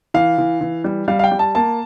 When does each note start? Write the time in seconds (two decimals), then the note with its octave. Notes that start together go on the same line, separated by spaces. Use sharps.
0.14 E3 F5
0.38 E3
0.61 E3
0.84 G3
1.08 G3 F5
1.19 F5
1.24 G5
1.31 G3
1.39 A5
1.55 A#3 A5